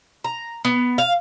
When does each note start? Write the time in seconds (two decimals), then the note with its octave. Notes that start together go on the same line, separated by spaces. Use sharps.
0.24 A#5
0.65 B3
0.98 F5